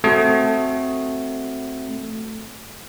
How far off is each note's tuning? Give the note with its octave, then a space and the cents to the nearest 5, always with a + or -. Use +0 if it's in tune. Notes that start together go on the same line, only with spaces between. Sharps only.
A3 +0 C4 +0 F#4 +10